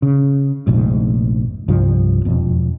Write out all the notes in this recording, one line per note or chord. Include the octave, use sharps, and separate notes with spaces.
C#3
F1 A#1 G#2
C2 G2 F3
E1 F2